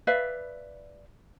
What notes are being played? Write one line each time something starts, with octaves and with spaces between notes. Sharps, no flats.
B4 D5 E5 F5